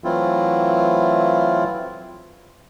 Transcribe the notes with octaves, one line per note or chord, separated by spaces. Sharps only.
E3 F#3 A3 C4 E4 F4